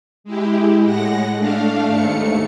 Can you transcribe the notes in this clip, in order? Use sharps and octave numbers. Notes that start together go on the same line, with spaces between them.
G#3 E4 G4
A2 G#3 F#5 A#6
A3 D4 F5
D#2 G#2 A3 C#7